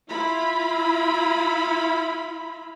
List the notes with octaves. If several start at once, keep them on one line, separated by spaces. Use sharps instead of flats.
E4 F4 B5